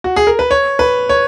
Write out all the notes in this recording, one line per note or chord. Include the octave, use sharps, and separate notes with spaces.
F#4
G#4
A#4
B4
C#5
B4
C#5